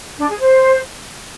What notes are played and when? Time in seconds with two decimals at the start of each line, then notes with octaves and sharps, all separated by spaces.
0.19 D4
0.29 G#4
0.39 C5